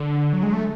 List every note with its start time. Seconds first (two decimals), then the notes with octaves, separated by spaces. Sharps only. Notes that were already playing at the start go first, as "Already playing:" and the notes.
Already playing: D3
0.33 F#3
0.43 G#3
0.53 A3